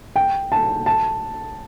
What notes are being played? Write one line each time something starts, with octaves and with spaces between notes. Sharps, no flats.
G5
A5
A5